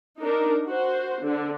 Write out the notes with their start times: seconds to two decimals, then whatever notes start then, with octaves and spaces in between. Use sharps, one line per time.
0.20 D4 D#4 A#4
0.67 F#4 C5
1.24 D3